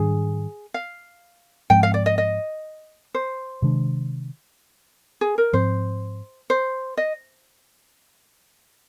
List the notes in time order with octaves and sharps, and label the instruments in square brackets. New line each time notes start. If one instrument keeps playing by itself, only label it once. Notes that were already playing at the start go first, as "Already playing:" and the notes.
Already playing: [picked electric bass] G#2 D#3 G3 D4 [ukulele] G#4
[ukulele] F5
[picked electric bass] G#2 F3 G#3 C4 [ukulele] G5
[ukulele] F5
D5
D#5
D#5
C5
[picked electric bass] C3 D#3 G#3 D4
[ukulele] G#4
A#4
[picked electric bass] G#2 F3 C4 [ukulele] C5
[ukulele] C5
D#5